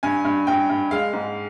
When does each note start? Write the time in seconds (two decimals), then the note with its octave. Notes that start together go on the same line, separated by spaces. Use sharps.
0.03 G2 G#5
0.25 G2
0.47 G2 G5
0.69 G2
0.91 G#3 F5
1.13 G#2